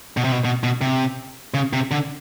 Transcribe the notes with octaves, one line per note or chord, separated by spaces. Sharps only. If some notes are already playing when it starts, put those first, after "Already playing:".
B2
C3
B2
B2
B2
C3
C#3
C3
D3